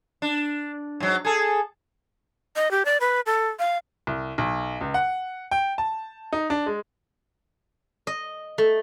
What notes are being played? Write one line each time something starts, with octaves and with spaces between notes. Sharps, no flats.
D4
G#2 F#3
G#4 A4
D#5
G4
D5
B4
A4
F5
C2
B1
C#2
F#5
G5
A5
D#4
D4
G#3
D#5
A3